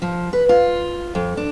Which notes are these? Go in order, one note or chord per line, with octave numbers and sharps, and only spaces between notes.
F3
B4
F4
F2
D4